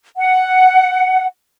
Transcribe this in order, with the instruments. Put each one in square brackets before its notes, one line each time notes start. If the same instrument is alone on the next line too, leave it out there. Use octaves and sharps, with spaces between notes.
[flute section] F#5